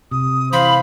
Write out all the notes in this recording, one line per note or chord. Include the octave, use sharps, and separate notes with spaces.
C3 D#6
E3 C5 F5 B5